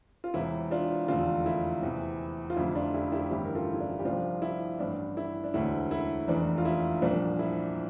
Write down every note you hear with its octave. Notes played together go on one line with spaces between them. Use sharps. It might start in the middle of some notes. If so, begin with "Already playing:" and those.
F4
E1 E2 C3 E3 E4
D4 F4
F1 E2 D3 D4 F4
E4
E2 C3 E3
F4
F1 F2 D3 F3 E4
D4 F4
E4 G4
E4 G4
A1 G2 D3 E4 G4
A#4
F4 A4
E4
D4 F4
G4
C2 C3 F3 D4 F4
E4
A1 G2 E3 D4
E4
D4
E1 D2 D3 E4
E4
F1 E2 E3 D4
F4
E4
C2 A#2 F3 D4
E4